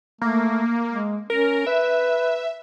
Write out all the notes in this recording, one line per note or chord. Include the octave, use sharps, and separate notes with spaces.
A3 A#3
G#3
C#4 A#4
B4 E5